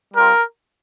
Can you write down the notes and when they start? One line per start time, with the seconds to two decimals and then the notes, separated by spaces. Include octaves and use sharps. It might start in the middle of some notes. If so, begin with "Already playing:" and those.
0.14 G3 C4 F4 A#4